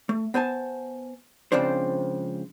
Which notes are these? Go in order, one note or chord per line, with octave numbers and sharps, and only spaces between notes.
A3
B3 C5 G#5 A5
C#2 C#3 F3 C4 D4 C5